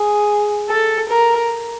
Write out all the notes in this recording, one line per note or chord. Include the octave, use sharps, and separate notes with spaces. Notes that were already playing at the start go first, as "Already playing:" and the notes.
Already playing: G#4
A4
A#4